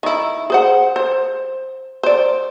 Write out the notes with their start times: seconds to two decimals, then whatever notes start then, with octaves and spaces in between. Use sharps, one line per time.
0.03 D#3 E4
0.50 G#4 C5 F#5
0.96 C5
2.03 C5 D5